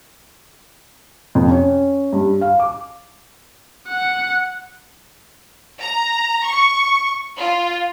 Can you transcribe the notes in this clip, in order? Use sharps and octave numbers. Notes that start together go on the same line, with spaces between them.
F2
C#4
G2
F5
D6
F#5
A#5
C#6
F4